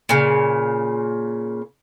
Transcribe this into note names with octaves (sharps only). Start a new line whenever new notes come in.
A#2 C#3